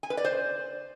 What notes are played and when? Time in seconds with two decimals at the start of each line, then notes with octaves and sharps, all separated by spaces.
0.03 G#5
0.10 B4
0.17 D5
0.25 C5